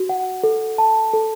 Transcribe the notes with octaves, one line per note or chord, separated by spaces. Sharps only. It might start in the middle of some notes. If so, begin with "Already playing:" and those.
Already playing: F#4
F#5
A4
A5
A4